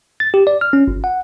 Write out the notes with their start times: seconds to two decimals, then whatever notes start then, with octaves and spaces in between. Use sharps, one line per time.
0.20 A6
0.34 G4
0.47 D5
0.61 F6
0.73 C#4
0.88 G1
1.04 F#5